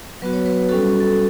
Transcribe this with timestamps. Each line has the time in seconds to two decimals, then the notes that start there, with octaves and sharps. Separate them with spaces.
0.22 F#3 B3 F#4 B4
0.33 C#5
0.46 B4
0.69 G3 C#4 F#4 A4
1.00 A4